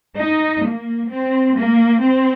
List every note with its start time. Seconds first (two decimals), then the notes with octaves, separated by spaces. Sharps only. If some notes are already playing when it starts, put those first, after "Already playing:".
0.17 D#4
0.64 A#3
1.09 C4
1.57 A#3
2.03 C4